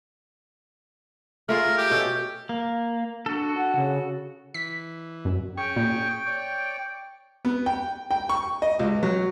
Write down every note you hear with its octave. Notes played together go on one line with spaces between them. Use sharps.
A3 F4 G#4 A#4
G4
B2 C#4 A4
A#3
D4 F#4 A4
F#5
C#3
E3 B6
F#2
C#4 G#4 G5 C#6
A#2
C#5 D5
B3
G5
G5
C#6
D#5
C#2
F#3